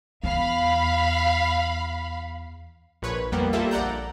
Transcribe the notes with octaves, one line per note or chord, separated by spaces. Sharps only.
E2 F5 B5
A#1 A#2 B4 C#5
F2 G3 A#3 B3
G3 A#3 F4 A4 E5
A#1 D5 F#5 A#5 G6